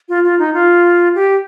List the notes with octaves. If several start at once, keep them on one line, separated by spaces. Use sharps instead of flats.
F4
F4
D#4
F4
G4